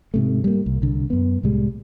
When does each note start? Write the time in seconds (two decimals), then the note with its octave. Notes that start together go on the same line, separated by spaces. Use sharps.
0.14 G#2 C3 A3
0.44 G3 A#3
0.66 C2
0.82 C2 D3
1.10 F#2 B3
1.43 C2 A2 G3 G#3